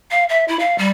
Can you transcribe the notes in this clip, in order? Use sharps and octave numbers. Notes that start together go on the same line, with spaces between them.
F5
E5
E4
F5
G3